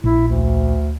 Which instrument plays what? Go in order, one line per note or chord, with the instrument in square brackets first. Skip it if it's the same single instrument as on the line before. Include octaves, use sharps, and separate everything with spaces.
[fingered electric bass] A#1 [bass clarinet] E4
[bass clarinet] D2